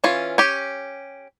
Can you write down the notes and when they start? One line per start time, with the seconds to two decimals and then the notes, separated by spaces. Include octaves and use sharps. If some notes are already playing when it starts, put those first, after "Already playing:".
0.04 E3 C#4 F4
0.38 C#4 G4